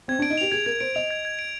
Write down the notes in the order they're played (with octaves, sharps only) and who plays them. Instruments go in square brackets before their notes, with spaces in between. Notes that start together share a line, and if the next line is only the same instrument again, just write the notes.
[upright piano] C4 [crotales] G#6
[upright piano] D4 [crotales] D7
[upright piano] D#4
[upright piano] G4 [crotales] F7
[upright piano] G#4 [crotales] G#6
[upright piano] A#4 [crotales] G#6
[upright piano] C5 [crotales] D7
[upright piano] D#5 [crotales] F7
[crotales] G#6
G#6
D7